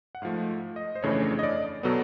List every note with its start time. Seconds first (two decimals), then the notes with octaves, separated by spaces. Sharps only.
0.15 F#5
0.22 G#2 F3 A3 F5
0.76 D#5
0.95 C5
1.03 F2 C#3 E3 A3 D4 C#5
1.23 C#5
1.39 D#5
1.43 D5
1.83 B2 F#3 B3 A4